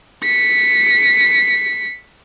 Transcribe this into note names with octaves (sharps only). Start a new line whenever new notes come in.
B6 C#7